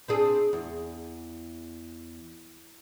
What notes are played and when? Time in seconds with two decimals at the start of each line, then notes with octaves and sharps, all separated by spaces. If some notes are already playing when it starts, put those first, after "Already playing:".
0.08 C4 D4 G#4
0.53 E2